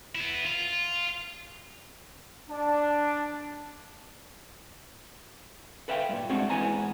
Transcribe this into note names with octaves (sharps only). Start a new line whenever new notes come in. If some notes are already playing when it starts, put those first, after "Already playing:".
B3 E4
F4
D4
A4 B4 E5 F5 G5
G2 A#2
G#3 A3 C4 D4 F#4
G#2 E3 B3 G#5 A#5